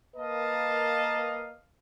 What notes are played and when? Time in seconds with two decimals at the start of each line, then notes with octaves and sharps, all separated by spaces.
0.16 A#3 A#4 B4 D#5 F5 A5